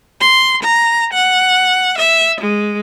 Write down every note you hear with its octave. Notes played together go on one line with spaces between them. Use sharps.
C6
A#5
F#5
E5
G#3